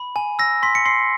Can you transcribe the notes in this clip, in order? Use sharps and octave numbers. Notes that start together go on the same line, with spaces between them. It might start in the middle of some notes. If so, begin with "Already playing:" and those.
Already playing: B5
G#5
E6 A#6
C6 B6
C#7
C6 C7